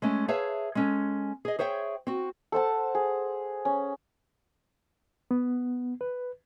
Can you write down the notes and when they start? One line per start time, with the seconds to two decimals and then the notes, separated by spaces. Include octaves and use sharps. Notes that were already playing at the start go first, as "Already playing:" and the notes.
0.02 G#3 A3 C#4
0.28 G#4 B4 C#5 E5 F5 A5
0.75 G#3 C#4 A4
1.45 G#4 D#5
1.59 G#4 C5 C#5 E5 G5
2.07 C4 F#4
2.52 A4 C5 F#5 A5
2.95 G#4
3.65 C#4
5.31 B3
6.01 B4